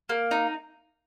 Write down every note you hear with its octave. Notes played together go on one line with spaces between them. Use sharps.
A#3
D#4